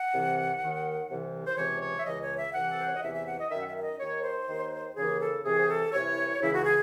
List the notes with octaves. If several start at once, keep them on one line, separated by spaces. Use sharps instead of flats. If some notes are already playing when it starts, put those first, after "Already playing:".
Already playing: F#5
C2 C3 E3
D#2 D#3
C2 C3 E3
C5
C#2 C3 E3 C#5
C#5
E5
C#2 C#3 E3 D#5
C#5
E5
C2 C3 E3 F#5
A4
C5
C#5
D#5
E2 C3 E3 E5
E5
F#5
D#5
F#2 D#3 E5
F#5
E5
E5
D#5
D#2 D#3 C#5
C5
D#2 D#3
D#2 C#3 E3 G#4
A4
C2 C3 E3 G#4
C5
A4
C2 C3 E3 C#5
C#2 C#3 E3 E4
F#4
G#4